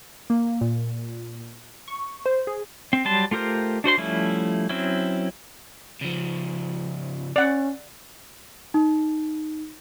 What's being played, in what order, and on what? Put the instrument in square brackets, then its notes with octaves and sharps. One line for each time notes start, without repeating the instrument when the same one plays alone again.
[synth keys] A#3
A#2
C#6
C5
G#4
[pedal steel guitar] C4
F#3 G3 A5 C6
A3 F4 G4 A#4 C5
D4 F#4 C5 C6
F3 G3 A3 C#4 E4
F#3 C4 C#4 E4
[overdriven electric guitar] C#3 F3
[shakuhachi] C#4 [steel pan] D5 F#5
[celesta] D#4